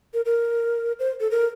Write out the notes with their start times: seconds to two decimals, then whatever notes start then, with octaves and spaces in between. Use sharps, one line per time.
0.14 A#4
0.25 A#4
0.99 C5
1.20 A4
1.31 A#4